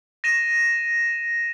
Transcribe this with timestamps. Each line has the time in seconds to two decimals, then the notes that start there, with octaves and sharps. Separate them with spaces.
0.24 A#6 D#7 E7